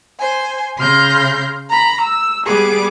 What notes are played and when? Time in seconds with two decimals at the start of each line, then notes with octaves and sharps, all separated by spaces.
0.18 C5 G#5
0.77 C#3 C6 F6 G6 A#6
1.69 A#5 B5
2.02 E6
2.44 G3 B3 G#4 D6